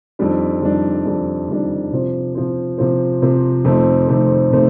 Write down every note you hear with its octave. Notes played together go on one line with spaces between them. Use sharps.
F2 D#3 G3 D4
F2 D#3 G3 D4
F2 D#3 G3 D4
F2 D#3 G3 D4
C3 F3 C4
C3 F3 C4
C3 F3 C4
C3 F3 C4
F2 C3 D#3 A3 C4
F2 C3 D#3 A3 C4
C3 D#3 A3 C4